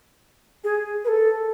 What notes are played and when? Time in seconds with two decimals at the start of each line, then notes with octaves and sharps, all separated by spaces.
0.64 G#4
1.04 B4
1.08 A4